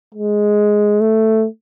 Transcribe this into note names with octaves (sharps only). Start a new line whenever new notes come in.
G#3
A3